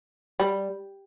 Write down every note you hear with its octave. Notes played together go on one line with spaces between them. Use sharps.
G3